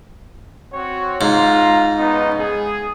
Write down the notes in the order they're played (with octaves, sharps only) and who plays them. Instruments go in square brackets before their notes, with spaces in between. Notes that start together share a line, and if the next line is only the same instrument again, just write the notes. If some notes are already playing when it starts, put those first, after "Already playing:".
[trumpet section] C4 F#4 C#5
[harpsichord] G#2 [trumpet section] F4 F5 A#5
[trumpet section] B3 C#4 D#4
G#4